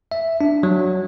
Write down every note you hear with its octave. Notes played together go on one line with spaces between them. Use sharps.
E5
D4
F#3